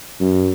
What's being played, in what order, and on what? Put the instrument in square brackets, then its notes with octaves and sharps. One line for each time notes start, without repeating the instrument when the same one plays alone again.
[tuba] F#2